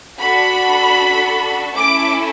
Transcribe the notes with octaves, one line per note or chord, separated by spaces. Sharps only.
D4 F#4 A4 B5
A3 C#4 E4 A4 D6